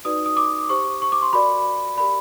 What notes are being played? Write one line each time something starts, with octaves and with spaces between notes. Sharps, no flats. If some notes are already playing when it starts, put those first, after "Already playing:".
D#4 F#4 B4 D5 D#6
D#6
D6
G4 C5 C#6
C#6
D6
C6
F#4 A#4 D5 B5
G4 A#4 D5 B5